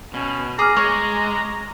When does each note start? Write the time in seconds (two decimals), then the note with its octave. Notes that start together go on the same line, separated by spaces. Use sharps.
0.14 B2 C#4
0.59 G#4 A#5 D6 D#6 F6
0.76 G#3 C#5